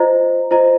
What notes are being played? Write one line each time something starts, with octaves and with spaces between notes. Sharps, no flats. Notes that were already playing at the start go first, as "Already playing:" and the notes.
Already playing: F4 C5 D#5 A#5
F4 C5 D#5 A#5